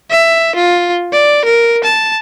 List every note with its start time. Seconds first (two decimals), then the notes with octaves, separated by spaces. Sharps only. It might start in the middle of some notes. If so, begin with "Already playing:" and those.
0.11 E5
0.56 F4
1.13 D5
1.45 A#4
1.84 A5